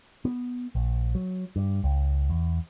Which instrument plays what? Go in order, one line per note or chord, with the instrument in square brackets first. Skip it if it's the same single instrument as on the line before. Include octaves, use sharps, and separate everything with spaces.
[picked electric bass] B3
A#1
F#3
G2
C#2
E2